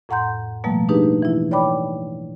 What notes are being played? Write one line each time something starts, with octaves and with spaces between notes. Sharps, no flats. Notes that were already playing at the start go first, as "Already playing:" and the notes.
F2 A2 F#5 A#5 C6 G6
B2 F3 G3 A3 A#3
D4 D#4 G4 G#4 B4
E3 E4
C#5 D5 G5 B5 D6